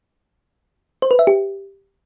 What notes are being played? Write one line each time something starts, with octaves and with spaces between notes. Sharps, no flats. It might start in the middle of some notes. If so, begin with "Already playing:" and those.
C5
B4
E5
G4